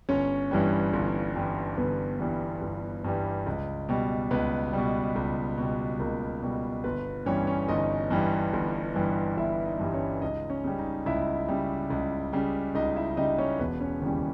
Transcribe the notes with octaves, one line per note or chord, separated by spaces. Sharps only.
G1 C#4 C#5
G2 E3 G3
G1
G2 E3 G3
G1 B3 B4
G2 E3 G3
G1
G2 E3 G3
C#2
B2 G3
C#2 B3 B4
B2 G3
C#2
B2 G3
C#2 A#3 A#4
B2 G3
G1 B3 B4
G2 E3 G3 C#4 C#5
C#4 C#5
G1 D#4 D#5
G2 E3 G3
G1
G2 E3 G3
G1 E4 E5
D#4 D#5
G2 E3 G3
C#4 C#5
C#2 D#4 D#5
C#4 C#5
C#3 G3
D#4 D#5
C#2 E4 E5
C#3 G3
C#2
C#3 G3
C#2 D#4 D#5
E4 E5
C#3 G3 D#4 D#5
C#4 C#5
E1 B3 B4
C#4 C#5
D#2 C#3 E3 G3